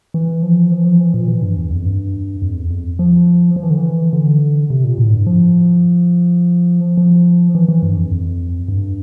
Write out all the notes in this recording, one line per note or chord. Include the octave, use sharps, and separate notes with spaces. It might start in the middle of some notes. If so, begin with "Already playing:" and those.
E3
F3
E3
F3
E3
A#2
E3
G2
E2
F2
G2
F2
E2
F2
F3
F3
E3
D3
E3
D3
C3
A#2
A2
G2
F3
F3
E3
E3
G2
F2
F2
G2